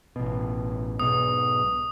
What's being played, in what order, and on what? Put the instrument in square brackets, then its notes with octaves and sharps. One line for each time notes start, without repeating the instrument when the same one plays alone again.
[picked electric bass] A1 B2
[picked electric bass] B1 G#2 B2 [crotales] D#6